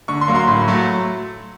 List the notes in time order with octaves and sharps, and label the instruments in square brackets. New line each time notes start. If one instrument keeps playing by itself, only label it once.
[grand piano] D3 C#6
C6
F#3 A#3
C6
A2
F#3 A3